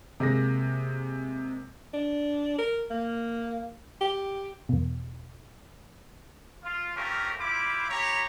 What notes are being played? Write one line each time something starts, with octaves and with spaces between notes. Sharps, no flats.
C3 G#3 A#3 A#6
D4
A#4
A#3
G4
E2 B2
F4
A3 C4 C#4 F4 G4 A#4
G3 E4 F4 C5 B5 D6
E4 G4 C#5 A#5